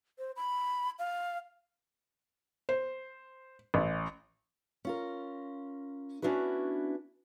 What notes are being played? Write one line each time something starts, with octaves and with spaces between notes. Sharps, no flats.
C5
B5
F5
C5
A1
C#4 F4 A#4
B3 C#4 D4 E4 F#4 B4